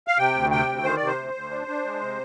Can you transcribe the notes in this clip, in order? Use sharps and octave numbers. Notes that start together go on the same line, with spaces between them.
F5
C3 G5
D2
C3 G5
D2
D#3 C5
C3 D5
C5
D2
D2
D4
D4
G#3
C3